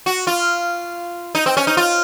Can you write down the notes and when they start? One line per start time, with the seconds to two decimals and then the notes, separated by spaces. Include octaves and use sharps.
0.06 F#4
0.27 F4
1.35 D#4
1.46 C4
1.57 C#4
1.67 D#4
1.77 F4